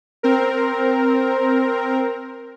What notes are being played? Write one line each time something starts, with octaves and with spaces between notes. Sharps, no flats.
C4 A#4